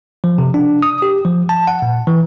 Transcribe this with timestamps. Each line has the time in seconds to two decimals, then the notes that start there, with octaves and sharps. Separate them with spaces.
0.24 F3
0.38 C3
0.54 D4
0.83 D#6
1.02 G4
1.25 F3
1.49 A5
1.67 F#5
1.82 A#2
2.07 E3